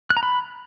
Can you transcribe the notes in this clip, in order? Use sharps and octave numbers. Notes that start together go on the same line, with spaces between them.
F#6
A#5
B5